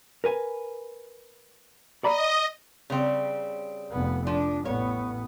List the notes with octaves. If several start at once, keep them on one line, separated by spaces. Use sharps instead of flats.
A#4 B4 G#5
D5 D#5 A#5 B5
C#3 G3 C4
F1 B3
F3 D4
A1 B3 C#5